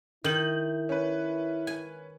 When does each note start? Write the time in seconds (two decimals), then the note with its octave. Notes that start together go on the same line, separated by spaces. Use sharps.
0.24 D#3 E4 G6 F#7
0.89 C#4 B4
1.67 G#5